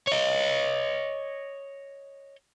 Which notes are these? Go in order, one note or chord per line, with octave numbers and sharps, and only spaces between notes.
C#5 D#5